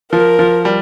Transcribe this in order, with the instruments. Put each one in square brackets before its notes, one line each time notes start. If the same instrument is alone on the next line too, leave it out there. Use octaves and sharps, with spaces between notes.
[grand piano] F3 [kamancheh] A#4
[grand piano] F3
G3